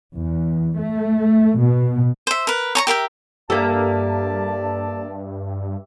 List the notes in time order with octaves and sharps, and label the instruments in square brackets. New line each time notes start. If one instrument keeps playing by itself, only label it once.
[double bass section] E2
A3
B2
[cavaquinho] C5 E5
A#4 B4
C#5 A#5 C#6
G4 A#4 E5 G5
[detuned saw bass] G2 [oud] A#3 A4 [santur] G4 E5 F5 [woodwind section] D5 A5